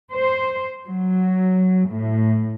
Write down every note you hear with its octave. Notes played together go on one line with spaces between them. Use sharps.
C5
F#3
A2